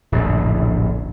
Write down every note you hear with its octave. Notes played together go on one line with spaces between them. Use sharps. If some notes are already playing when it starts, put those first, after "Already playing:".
D1 A#1 F#2